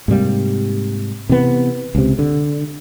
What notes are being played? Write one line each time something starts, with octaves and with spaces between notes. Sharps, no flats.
G#2 C3 G3 A#3
C3 E3 B3
C#2 C3
D3